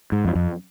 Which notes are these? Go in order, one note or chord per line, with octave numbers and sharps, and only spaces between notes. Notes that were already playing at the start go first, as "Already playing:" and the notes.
G#2
F2
F2